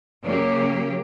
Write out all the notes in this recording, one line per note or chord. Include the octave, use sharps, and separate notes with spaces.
C#3 F#3 A#3 G4